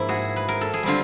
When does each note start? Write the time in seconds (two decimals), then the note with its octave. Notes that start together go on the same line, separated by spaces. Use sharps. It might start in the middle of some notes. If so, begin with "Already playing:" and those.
Already playing: G#2 F3 A#3 E4
0.09 F#4 G#4
0.36 B4
0.48 A#4
0.61 A4
0.74 G#4
0.83 D3 G3 C4 F4